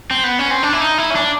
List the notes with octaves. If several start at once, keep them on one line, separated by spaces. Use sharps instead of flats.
C4
B3
C#4
C4
D4
E4
D#4
E4
C#4
D4